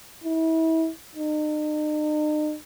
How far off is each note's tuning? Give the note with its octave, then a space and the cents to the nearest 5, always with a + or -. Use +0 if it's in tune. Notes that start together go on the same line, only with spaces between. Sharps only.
E4 -30
D#4 -40